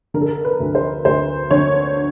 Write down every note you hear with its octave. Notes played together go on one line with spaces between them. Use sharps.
D3 A#4
A4
A#4
B4
D2
C5
D2 C5
D3 C#5